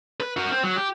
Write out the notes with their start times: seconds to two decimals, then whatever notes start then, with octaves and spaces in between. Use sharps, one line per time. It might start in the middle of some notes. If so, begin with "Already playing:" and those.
0.20 B4
0.37 F#4 A#4
0.51 C4
0.64 F#3
0.76 G4